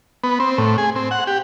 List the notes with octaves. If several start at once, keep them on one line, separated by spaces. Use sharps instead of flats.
B3
C4
A2
G#4
C4
F#5
G4